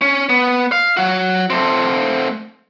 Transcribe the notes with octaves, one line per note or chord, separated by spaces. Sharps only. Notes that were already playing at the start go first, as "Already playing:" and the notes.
C#4
B3
F5
F#3 F#4
A3 C4